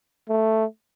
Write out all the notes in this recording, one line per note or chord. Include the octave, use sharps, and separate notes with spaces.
A3